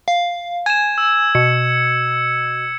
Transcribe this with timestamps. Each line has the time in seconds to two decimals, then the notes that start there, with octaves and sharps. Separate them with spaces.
0.08 F5
0.66 G#5 G#6 E7
0.98 E6
1.35 B2 C#7